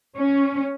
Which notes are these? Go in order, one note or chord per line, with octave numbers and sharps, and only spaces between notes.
C#4